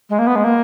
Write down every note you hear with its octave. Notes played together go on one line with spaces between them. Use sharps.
G#3
A#3
B3
G#3
A#3